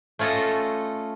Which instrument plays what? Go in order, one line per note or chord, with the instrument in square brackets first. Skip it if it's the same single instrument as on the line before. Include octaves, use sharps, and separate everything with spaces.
[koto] A3 C#4 F4 A4 D#5